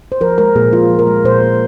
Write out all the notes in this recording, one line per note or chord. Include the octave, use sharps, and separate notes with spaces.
C5
F3 A#4
G#3 A#4
A#2 G#4
F3 F4
F3
A#4
G#3
A#2 C5
A#2